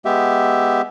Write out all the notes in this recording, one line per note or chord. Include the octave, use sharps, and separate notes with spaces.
G#3 B3 G4 E5